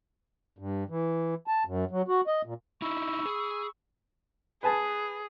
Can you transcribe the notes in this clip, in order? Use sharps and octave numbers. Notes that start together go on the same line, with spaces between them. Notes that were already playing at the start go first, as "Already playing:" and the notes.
G2
E3
A5
F#2
F#3
F#4
D#5
A#2
D#4 E4 B5 C#6 E6
G#4
G#4 B4 G#5 A5